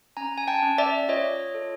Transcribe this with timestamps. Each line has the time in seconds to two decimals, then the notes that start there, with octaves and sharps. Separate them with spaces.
0.17 C#4 G#5 A#5
0.38 G#5
0.48 G5 A5
0.63 C#4
0.78 D5 E5
1.09 F4 C#5 D#5
1.55 A4